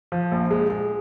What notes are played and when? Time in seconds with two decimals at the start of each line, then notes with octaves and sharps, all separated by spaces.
0.12 F3
0.32 A#1
0.50 G#3
0.70 G#3